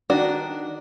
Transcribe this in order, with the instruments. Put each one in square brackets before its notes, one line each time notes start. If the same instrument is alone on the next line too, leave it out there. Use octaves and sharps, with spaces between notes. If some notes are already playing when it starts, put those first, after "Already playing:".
[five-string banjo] D#3 D4 F#4